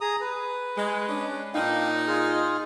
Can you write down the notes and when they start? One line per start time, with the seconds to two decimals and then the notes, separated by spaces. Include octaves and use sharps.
0.01 G#4 A#5 D#6
0.21 B4
0.77 G#3
1.08 C#4 D4
1.54 A#2 D4 D#4 F5 G5
2.07 F4 G#4 F6